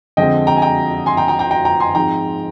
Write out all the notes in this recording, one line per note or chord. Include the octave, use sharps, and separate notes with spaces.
F2 D3 G#3 C4 D#5 G5
G5 A#5
G#5
G5 A#5
G#5 C6
G5 A#5
G5 A#5
G5 A#5
G5 A#5
G5 A#5
G#5 C6
G#2 F3 G#3 C4 G5 A#5